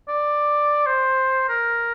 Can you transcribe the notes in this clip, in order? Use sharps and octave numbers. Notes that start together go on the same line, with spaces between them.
D5
C5
A#4